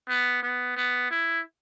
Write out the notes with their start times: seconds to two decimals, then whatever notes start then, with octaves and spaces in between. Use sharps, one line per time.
0.09 B3
0.43 B3
0.77 B3
1.11 E4